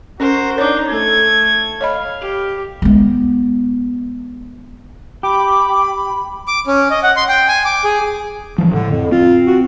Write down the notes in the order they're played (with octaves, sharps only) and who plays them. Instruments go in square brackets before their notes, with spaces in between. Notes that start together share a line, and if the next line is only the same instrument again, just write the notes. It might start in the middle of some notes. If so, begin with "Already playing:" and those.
[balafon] C#4 [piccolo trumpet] F#4 [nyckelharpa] A#4 C5
[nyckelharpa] D4 D#4 [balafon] C#5 D6 [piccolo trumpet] G6
[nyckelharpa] A3 A4 [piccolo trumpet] G#6
[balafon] C#5 D#5 B5 [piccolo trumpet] F5
[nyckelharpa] G4
[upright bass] G#3 B3
[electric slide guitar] G4 [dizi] B5 [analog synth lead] D6
[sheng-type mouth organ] D6
C#4
D#5
F#5
C6
G5
G#5
D6
G#4
[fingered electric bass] G2 E3 F3
[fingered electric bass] A2 [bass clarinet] D3
[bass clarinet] F2
[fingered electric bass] C4 [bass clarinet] F4
[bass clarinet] F#4